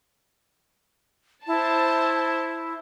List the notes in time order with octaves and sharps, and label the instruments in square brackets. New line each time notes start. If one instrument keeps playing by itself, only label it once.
[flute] E4 [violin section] C5 A5